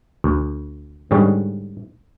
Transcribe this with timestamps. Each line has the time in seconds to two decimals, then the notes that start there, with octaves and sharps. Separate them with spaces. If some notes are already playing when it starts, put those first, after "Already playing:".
0.24 D2
1.11 G#2 D3 G3 C#4